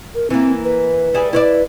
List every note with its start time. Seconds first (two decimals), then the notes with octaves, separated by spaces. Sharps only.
0.15 A#4
0.30 E3 A#3 C4
0.64 B4
1.14 G3 E4 G#4
1.33 E4 B4 C#5 D5